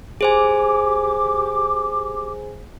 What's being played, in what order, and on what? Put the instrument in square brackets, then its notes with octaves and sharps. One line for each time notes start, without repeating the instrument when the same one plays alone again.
[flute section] G4 D6 [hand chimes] G#4 C5 G#5